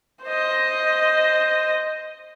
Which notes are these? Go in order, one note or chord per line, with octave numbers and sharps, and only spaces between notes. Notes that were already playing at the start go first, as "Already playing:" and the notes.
C5 D#5